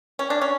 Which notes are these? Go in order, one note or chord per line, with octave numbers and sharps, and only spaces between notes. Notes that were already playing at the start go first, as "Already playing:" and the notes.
C#4
D4
C#4